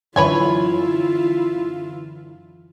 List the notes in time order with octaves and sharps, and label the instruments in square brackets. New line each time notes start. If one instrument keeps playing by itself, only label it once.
[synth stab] F#2 D3 E3 [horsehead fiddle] E4 F4 [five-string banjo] B4 C#5 G#5